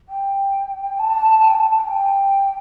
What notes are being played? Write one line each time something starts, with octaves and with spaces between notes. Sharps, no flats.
G5
A5
G5
A5
A5
G5